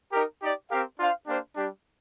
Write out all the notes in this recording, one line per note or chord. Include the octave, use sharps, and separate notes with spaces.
D#4 G4 A#4
D#4 G4 D5
C4 G4 A#4 F5
D4 F4 C5 F5
A#3 D4 G4 C5 F5
G3 D4 G4